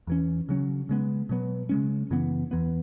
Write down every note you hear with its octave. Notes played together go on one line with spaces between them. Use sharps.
E2 E3 C#4
C#3 F#3 C#4
C#3 G#3 B3
B2 F#3 B3
C#3 G#3 C#4
F#2 C#3 E3 B3
E2 E3 B3